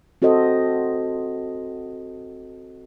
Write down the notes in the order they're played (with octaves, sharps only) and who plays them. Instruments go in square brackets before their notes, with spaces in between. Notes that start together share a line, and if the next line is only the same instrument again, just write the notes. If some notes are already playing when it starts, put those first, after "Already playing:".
[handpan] C4 F#4 A4 C5 D#5